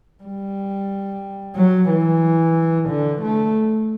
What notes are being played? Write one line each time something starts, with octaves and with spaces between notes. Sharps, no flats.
G3
F#3
E3
D3
A3